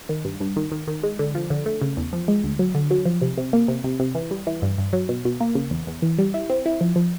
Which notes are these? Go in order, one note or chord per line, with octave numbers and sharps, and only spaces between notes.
D#3
G2
G2
D#3
D#3
D#3
G#3
D3
F3
D3
A3
C#3
E2
F3
G#3
D2
F#3
D3
F#3
F3
C3
C3
A#3
C3
C3
C3
E3
G3
E3
G2
G2
F#3
B2
B2
A#3
C#3
E2
E2
E3
G3
E4
C4
E4
F3
F3